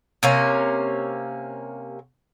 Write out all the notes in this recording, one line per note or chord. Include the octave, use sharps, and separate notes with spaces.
C3 A#3 C#4